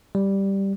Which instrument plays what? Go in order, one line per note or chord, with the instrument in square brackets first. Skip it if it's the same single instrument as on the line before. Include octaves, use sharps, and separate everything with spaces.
[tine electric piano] G3